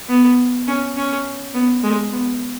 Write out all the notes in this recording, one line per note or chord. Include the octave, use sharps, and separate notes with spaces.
B3
C#4
C#4
B3
G#3
B3